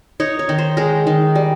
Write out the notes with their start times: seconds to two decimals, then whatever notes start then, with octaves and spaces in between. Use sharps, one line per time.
0.20 D#4 C#5
0.39 C#5
0.49 D#3
0.59 C5
0.77 G#3 A#4
1.07 D#3
1.35 G3